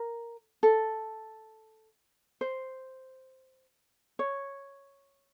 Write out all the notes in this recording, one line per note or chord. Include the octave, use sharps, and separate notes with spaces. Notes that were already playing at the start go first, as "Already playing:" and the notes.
Already playing: A#4
A4
C5
C#5